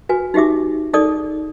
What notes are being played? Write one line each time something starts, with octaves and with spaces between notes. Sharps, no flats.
F#4 B4 G#5
D#4 F#4 G4 E5 D6
D#4 G#4 A4 D5 D#6